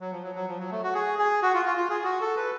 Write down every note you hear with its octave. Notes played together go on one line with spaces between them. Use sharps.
F#3
F3
F#3
F#3
F3
F#3
A3
F#4
G#4
G#4
F#4
F4
F4
F4
G#4
F#4
A4
B4